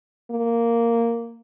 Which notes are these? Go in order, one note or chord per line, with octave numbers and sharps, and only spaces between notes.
A#3